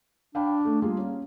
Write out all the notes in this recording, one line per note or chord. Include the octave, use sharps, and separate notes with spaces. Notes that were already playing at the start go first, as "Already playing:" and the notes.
D4 F5 G5 B5
A3
G3 A#3 F4 G#4
C#4